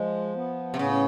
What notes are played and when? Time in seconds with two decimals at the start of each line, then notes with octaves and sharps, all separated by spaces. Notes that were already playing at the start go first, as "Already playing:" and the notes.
Already playing: F3 G#3
0.36 B3
0.74 C3
0.79 A2 C#3